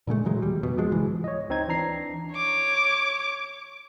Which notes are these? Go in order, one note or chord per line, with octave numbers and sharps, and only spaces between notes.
A#2 D3 G#3 A3
A#2 E3 F#3 G#3
D#2 G3
F1 B2
F3 F#3 G#3
C#2 G#2 E3
C#5 D#5
D2 C4 D#4 G#6
E3 D4 A#5 C7
C#5 D6